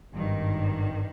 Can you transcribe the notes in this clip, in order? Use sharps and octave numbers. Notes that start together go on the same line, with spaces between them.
G#1 G2 D#3